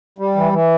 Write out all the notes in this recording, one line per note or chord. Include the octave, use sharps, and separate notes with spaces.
G3
E3
E3